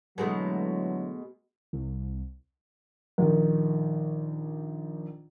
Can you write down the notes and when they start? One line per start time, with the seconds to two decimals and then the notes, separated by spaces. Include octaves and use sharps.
0.18 B2 D3 E3 F#3 G#3 A3
1.73 C2
3.18 A#1 D#3